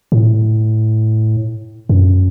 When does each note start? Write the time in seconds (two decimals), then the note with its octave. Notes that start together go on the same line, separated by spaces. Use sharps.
0.12 A2
1.89 F#2